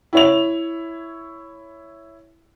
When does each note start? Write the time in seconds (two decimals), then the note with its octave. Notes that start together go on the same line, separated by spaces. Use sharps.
0.13 E4 C#5 F7